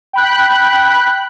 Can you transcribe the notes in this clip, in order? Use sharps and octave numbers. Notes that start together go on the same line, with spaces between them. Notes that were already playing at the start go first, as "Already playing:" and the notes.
G5 B5 F#6